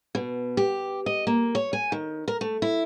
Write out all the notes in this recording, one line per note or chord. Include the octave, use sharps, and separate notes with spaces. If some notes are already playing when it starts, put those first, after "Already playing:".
B2
G4
D#5
A#3
C#5
G#5
D#3
A#4
A3
E4